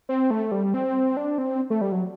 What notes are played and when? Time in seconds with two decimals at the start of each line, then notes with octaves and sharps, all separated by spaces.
0.09 C4
0.31 A3
0.52 G3
0.74 C4
1.17 D4
1.38 C4
1.70 A3
1.81 G3
1.92 F#3